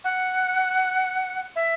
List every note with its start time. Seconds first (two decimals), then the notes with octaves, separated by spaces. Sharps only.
0.04 F#5
1.56 E5